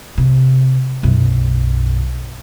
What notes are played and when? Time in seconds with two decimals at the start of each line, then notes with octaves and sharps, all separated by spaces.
0.18 C3
1.03 B1 F#2